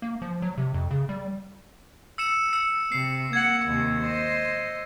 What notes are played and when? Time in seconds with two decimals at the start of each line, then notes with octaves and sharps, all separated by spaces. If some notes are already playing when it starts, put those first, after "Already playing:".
0.02 A#3
0.22 F3
0.42 F#3
0.58 C3
0.74 F2
0.91 C#3
1.09 G3
2.18 E6 C#7 E7
2.53 E6 C#7
2.92 C3 C7
3.33 A#3 F#5 G#6
3.67 D#2 C3
4.01 C5 D#5